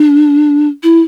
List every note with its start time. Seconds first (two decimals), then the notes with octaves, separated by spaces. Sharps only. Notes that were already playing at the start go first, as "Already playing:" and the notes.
Already playing: D4
0.83 E4